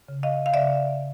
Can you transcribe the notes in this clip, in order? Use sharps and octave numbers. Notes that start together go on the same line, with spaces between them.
C#3
D#5 F5
F5
C#3 D5 E5